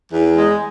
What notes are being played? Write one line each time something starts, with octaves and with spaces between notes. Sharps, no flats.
E2
G#3